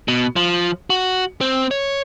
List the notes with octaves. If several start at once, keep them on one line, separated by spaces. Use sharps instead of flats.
B2
F3
F#4
C4
C#5